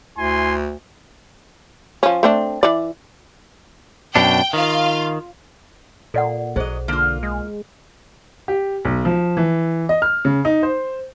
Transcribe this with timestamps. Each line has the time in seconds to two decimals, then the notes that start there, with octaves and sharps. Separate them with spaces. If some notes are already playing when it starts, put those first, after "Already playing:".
0.17 D2 E4 G#5 C6
2.03 F3 C#4
2.23 A3 C4 D4
2.63 E3 D5
4.16 F#2 B2 D4 G5
4.53 D#3 F4 F5
6.14 A#2 A4 D5 F#5
6.56 B1 F#3 G#4 C5 D#5
6.88 D3 A#3 F4
7.23 G#3
8.48 G4
8.85 B1
9.05 F3
9.37 E3
9.89 D#5
10.02 F6
10.25 C#3
10.45 D#4
10.63 C5